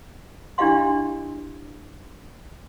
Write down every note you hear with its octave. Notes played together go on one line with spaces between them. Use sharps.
D4 E4 G4 D#5 F5 C6